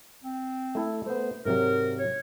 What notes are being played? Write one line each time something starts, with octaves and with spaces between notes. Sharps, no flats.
C4
A3 E4 A4
A3 B3 C5
G#2 C3 F#3 A#4
C#5